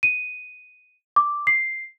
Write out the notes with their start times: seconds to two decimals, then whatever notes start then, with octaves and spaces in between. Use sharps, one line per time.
0.03 D#7
1.16 D6
1.47 C7